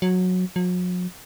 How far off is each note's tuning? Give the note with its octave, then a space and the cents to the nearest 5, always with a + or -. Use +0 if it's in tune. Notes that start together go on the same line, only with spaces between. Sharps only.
F#3 -15
F#3 -45